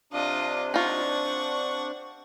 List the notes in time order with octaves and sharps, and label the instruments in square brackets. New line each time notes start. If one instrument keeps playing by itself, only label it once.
[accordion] C3 D4 [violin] F4 D#5
[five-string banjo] D#4 F4 [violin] F#5 C#6